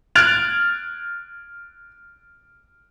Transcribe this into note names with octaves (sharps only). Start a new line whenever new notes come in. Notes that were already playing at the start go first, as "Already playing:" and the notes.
F6 F#6 G#6 A6 D7 F7